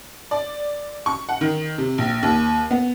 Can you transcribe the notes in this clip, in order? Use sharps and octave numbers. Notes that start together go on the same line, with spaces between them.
D5
C#6
F#5
D#3
C3
A#1
D#2
B3